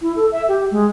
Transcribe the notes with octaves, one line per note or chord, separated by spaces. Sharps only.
E4
A4
E5
G4
G#3